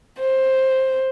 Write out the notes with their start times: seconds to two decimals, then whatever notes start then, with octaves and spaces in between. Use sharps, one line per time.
0.20 C5